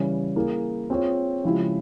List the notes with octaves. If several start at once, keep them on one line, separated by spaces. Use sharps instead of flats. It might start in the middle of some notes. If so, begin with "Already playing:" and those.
Already playing: C#3 E3 G3 C#4
A#3 E4 G#4
C4 F4 G#4 C#5
C#3 F3 G#3 E4 G4